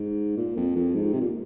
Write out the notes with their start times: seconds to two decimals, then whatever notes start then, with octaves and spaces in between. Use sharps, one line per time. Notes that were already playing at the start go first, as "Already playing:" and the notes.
Already playing: G#2
0.37 A#2
0.57 F2
0.76 F2
0.94 G#2
1.13 C3
1.20 A#2